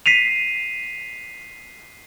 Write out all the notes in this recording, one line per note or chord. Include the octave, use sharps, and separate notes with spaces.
B6 C7 D#7 F7